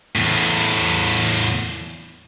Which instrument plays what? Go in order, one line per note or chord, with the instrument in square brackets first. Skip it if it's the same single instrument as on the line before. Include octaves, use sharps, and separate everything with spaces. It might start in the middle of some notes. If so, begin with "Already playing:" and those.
[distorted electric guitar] E2 A2